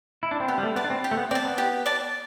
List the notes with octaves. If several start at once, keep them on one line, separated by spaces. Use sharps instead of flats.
E4
D4
C4
B3 G4
G3
A3
B3 D5 A5
D4
C4
G4
A3
B3
C4 D5 A5
B3
G4
D5 A5